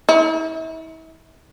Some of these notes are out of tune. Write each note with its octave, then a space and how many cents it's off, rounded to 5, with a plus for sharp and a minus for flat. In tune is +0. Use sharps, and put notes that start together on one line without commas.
E4 -40